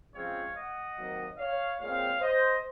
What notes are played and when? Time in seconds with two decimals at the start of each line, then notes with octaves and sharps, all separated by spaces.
0.14 C#3 F3 G#3 C4 C#5 F5
0.56 D#5 F#5
0.97 C3 D#3 F#3 A#3
1.38 C#5 F5
1.80 A#2 G#3 C4 C#5 F5
2.21 C5 D#5